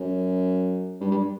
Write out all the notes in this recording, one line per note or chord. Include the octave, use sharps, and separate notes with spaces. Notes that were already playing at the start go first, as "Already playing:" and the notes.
Already playing: F#2
G2
G2